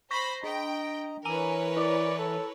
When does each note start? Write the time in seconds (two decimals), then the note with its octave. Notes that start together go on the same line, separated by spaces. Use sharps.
0.11 C5 B5 C#6 A#6 B6
0.43 D4 D#5 G5 A#5
1.25 E3 A#4 B4 C#5 G#5 A#5 D#7
1.77 E4 D5
2.18 A4